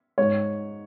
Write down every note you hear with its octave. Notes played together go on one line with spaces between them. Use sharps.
G#2 C#5